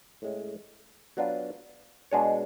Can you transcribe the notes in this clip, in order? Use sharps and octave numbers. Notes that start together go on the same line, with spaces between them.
A2 G#3 C#4
F#3 B3 D4 F4
B2 G#3 D4 G#4 C#5